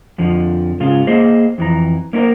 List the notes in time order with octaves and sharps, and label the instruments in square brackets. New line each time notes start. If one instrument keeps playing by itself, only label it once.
[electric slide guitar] F2 D3 F3
G#2 C#3 F4
A#3 G#4 C5 D#5
F2 E3 A#5
A#3 C#4 E4 A#4 C5